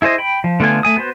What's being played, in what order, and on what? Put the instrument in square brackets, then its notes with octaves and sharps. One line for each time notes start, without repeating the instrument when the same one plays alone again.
[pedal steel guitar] E4 G#4 C5 D#5
G5 B5
F3
D3 A3 B3 F4 G#5
A3 G#5 D#6
B3 F#4 B4 C5